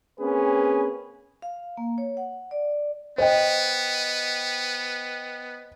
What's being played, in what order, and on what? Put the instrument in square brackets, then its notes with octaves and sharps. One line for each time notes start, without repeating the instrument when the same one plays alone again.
[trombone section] A#3 C4 C#4 G#4 B4
[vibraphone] F5
A#3
C#5
F#5
D5
[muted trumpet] B3 [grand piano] C5 D#5 G5